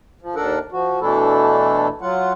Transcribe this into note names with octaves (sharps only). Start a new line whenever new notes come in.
F3
D#2 D4 A4 A#4 F#5
F3 F#4
B2 E3 A3 D4 E4 A4
F#3 F4 F#5